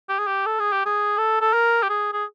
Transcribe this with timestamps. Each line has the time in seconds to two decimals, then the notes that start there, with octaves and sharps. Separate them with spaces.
0.09 G4
0.19 G#4
0.27 G4
0.46 A4
0.60 G#4
0.72 G4
0.86 G#4
1.18 A4
1.41 A4
1.54 A#4
1.83 G4
1.89 G#4
2.13 G#4